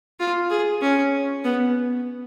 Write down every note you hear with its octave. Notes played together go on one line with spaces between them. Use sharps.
F4
G#4
C#4
B3